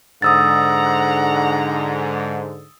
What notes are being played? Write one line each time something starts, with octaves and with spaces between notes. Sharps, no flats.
G#2 D3 F#5 A#5 D#6 E6 A6